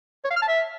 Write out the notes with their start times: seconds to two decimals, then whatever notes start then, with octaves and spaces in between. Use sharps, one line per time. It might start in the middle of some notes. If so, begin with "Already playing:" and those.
0.25 C#5
0.30 F5
0.36 F6
0.42 A5
0.48 E5